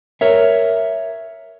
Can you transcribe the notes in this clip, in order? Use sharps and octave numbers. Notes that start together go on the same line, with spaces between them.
A#4 C#5 E5